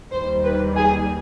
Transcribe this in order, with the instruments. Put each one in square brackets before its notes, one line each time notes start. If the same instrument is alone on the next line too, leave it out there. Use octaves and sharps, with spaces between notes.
[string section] D#2 D#3 G3 C5
B4
G#4